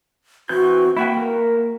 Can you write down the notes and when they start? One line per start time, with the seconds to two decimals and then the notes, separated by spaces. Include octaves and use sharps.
0.49 E3 C4 F#4 G6
0.97 A#3 E4 F#4 G5
1.17 A#4